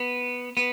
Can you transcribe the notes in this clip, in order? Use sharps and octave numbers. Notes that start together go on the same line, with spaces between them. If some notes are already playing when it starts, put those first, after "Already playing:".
Already playing: B3
B3